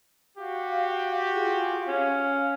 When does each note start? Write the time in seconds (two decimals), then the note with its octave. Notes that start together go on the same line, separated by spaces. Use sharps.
0.38 F#4 G4 F5
1.33 F4 G#4 F5
1.87 C#4 F5